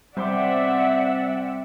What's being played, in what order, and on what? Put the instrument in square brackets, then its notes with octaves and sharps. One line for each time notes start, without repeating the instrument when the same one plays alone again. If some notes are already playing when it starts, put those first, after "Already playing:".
[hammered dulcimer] C3 C6 D6 [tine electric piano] G3 [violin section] D5 E5 F#5